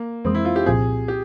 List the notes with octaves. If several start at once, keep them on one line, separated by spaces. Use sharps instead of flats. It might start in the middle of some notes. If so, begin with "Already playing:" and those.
Already playing: A#3
F2 E3 G#3 C4
E4
F4
G4
C2 A#2 F3 C4 G#4
G4